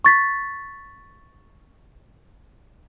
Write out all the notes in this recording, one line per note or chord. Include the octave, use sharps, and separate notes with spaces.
C#6 A6 B6